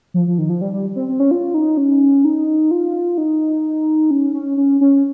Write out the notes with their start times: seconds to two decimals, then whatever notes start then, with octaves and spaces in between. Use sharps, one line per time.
0.14 F3
0.28 F3
0.38 D#3
0.49 F3
0.61 G3
0.73 G3
0.96 C4
1.09 C4
1.20 C#4
1.31 F4
1.54 D#4
1.77 C#4
2.25 D#4
2.71 F4
3.18 D#4
4.11 C#4
4.34 C#4
4.57 C#4
4.81 C#4